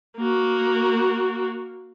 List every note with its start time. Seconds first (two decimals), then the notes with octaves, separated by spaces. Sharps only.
0.17 A#3 F#4